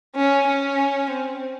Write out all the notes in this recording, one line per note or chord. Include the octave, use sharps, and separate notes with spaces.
C#4
C#4
C4